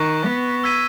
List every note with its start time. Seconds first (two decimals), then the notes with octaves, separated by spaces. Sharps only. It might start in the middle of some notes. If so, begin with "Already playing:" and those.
Already playing: D#3 C#6 F#6 A#6
0.26 B3
0.64 E6 G#6 B6 D#7